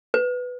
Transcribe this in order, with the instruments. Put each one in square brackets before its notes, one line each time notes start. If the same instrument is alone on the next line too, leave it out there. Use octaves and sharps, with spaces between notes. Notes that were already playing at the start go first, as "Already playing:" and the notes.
[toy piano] B4